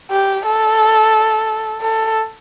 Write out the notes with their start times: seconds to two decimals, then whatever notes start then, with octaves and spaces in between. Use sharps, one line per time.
0.11 G4
0.45 A4
1.81 A4